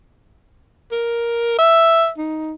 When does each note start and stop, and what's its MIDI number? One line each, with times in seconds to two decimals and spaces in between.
0.92 1.54 70
1.59 2.09 76
2.18 2.54 63